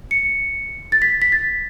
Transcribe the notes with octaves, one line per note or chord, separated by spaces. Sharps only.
C#7
A6
B6
B6
A6